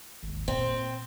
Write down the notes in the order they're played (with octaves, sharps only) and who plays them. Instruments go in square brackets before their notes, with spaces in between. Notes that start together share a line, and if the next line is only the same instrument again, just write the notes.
[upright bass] G#1 D#2
[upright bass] A#2 [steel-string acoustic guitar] C4